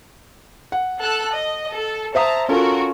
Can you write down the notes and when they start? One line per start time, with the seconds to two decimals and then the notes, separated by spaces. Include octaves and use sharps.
0.72 F#5
1.01 A4 A5 F#6
1.33 D#5
1.73 A4
2.15 C5 E5 A5 A#5 D#6
2.49 C#4 F4 F#4 A4 A#4